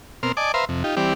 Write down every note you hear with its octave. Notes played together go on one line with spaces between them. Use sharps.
B2 C4 A#4 C6 F6
D5 D#5 G#5 A5 D6
B4 C5 E5 F5 A#5 C6
F2 C3
D#4 F4 G4
E3 G3 C4 G4 D5